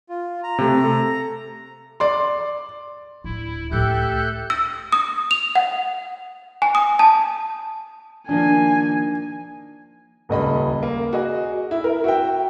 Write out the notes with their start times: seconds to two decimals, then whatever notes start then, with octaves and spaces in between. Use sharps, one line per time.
0.09 F4
0.43 A#5
0.58 C3 A3
0.84 A4
2.00 D5 C6
3.24 D1 E4
3.71 C#2 A2 G4 A4 E5 F#6 G6
4.50 E6
4.92 D#6
5.31 F7
5.55 F#5
6.62 G#5
6.75 D#6
6.99 A5
8.29 D#3 F3 A#3 D4 G#5
10.29 D#1 C#2 D#5 B5
10.83 A#3
11.13 F#4 G#4 D#5
11.71 E4
11.84 A#4
12.04 F#4 E5 G5